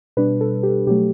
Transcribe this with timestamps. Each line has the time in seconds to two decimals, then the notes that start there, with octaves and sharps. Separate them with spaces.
0.17 B2 G3 D4 B4
0.41 A4
0.63 G4
0.87 B2 F#3 A3 G4